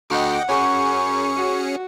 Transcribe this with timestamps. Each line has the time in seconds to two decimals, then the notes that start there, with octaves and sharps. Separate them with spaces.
0.10 D2 D#5 F#5 G5 D6
0.49 F#2 C#4 G#4 C#6 C#7
1.36 F#4